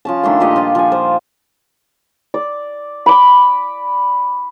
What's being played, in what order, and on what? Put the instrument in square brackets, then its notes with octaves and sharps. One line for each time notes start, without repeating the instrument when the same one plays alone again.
[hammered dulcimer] F3 C#4 A5
D#3 A3 D4 C6
A#2 F3 G4 D#5
F4 G4 D5
F3 G#5
C5
[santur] D5
B5 D6